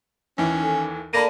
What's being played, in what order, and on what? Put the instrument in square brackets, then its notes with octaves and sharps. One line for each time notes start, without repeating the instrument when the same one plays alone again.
[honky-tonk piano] D#2 E3 [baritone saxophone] C#4
[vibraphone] A4 G#5
[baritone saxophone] A#3 [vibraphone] A4 D5 A5 [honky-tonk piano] B5 D#7